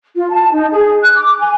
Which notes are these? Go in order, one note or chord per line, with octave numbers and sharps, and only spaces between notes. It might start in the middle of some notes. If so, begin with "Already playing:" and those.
F4
A5
D#4
G#4
F#6
D6
G#5